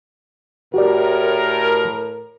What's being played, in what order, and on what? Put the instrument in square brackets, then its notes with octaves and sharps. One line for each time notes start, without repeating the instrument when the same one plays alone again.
[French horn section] A2 A#4 [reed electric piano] F#4 G4 D5